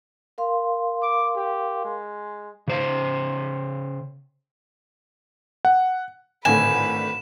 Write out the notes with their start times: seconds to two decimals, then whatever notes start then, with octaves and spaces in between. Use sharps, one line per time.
0.38 A#4 F5 C6
1.03 D6
1.36 G4
1.85 G#3
2.68 C#3 C5 F5
5.65 F#5
6.45 G#1 A2 D3 B4 G#5 E7